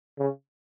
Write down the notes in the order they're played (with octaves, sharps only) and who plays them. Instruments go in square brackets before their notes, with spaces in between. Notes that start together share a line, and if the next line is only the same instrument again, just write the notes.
[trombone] C#3